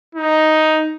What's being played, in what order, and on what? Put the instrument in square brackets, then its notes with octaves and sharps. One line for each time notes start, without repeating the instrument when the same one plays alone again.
[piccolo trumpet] D#4